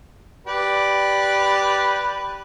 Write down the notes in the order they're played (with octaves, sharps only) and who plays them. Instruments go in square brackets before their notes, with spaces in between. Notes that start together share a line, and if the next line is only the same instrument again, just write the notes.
[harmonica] G4 B4 D5